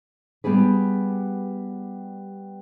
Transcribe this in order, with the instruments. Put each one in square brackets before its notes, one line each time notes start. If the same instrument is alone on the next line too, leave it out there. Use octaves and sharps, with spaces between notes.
[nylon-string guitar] G3 B3 G4 G#4 B4